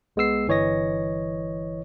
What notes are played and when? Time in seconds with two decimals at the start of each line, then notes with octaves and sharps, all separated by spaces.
0.16 C2 G#3 B3 E6 C7
0.48 G1 E3 C#5 D#5 A#6